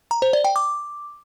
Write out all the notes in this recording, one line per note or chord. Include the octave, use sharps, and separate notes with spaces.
A#5
C5
D5
G5
D6